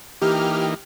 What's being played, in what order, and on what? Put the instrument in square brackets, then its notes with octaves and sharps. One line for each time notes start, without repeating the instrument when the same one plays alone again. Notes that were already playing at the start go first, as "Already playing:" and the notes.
[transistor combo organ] E3 A#3 D#4 [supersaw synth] G4 F6